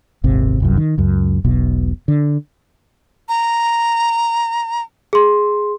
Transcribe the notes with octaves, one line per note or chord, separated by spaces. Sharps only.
D#1 G#1 C3
F1 C2 F#2
D#3
C#2 F#2
E1 B1 B2
D3
A#5
G#4 C6